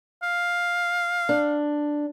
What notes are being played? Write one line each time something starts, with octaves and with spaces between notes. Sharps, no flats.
F5
D4